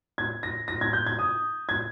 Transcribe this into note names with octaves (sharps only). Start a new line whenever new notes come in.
G#6
A#6
A#6
G#6
G6
G#6
D#6
G#6